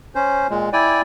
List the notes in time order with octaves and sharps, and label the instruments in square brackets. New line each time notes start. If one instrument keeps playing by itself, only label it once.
[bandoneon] C#4 C5
A#2 G#3
E4 D5 G5 G#5